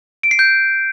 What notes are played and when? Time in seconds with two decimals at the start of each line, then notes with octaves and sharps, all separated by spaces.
0.23 D7
0.31 C7
0.39 G6